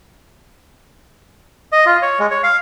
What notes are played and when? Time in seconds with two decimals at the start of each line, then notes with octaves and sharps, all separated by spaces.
1.72 D#5
1.86 F4
2.02 C#5
2.19 G#3
2.31 C#5
2.43 F5